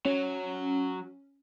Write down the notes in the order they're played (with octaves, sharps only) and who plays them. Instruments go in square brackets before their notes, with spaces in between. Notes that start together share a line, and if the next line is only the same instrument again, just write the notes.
[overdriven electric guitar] F#3 [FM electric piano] C#4